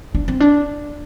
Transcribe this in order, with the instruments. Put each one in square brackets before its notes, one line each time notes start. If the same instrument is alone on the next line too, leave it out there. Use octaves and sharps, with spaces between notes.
[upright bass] D4
C4
D4